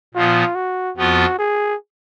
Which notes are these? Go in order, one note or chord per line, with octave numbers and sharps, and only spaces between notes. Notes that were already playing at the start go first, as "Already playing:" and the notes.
A#2 F3 B3 F4
F#4
F2 F3 B3 F4 F#4
G#4